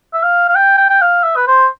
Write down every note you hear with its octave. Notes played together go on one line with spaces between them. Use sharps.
E5
F5
F5
G5
G5
G5
F5
E5
B4
C5